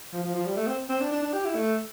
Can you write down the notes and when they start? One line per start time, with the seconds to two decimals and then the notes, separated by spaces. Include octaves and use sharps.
0.13 F3
0.23 F3
0.34 F3
0.46 G3
0.57 A3
0.67 C4
0.89 C4
1.00 D4
1.12 D4
1.22 D4
1.33 G4
1.45 E4
1.55 A3